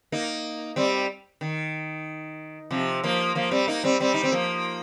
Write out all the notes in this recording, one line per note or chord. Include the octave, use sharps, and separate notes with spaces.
A#3 D#4
G3 C4
D#3
C3 F3
F3 A#3
F3 A#3
G3 C4
A#3 D#4
G3 C4
G3 C4
D#4
C4
F3 A#3